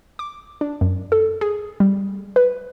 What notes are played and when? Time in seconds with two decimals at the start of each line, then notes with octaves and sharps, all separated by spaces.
0.19 D6
0.61 D4
0.81 F#2
1.12 A4
1.41 G#4
1.80 G3
2.36 B4